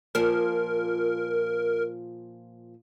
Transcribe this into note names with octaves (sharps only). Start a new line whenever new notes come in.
A#2 F3 A#4